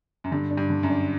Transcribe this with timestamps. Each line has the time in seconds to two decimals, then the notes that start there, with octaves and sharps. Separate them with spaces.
0.24 F#2
0.31 G2 D3
0.50 D4
0.57 G2
0.70 D3
0.83 F#2
0.90 D4